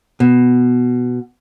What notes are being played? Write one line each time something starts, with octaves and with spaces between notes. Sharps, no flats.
B2